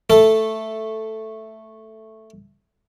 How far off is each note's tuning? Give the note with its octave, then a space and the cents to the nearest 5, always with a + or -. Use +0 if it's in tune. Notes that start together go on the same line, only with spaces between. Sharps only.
A3 +0 A4 +0